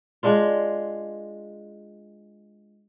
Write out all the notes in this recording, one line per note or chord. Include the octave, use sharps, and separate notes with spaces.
G#3 D4 F4